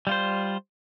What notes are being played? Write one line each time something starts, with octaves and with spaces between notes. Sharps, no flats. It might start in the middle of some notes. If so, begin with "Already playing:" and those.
G3 F4 C5